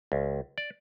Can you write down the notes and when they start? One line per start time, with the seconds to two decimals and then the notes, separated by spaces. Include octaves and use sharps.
0.12 C#2
0.58 D5